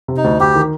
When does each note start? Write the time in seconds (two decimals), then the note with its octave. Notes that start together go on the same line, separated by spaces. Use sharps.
0.08 C3
0.17 D#4
0.24 D2
0.40 D2 G4
0.55 D#3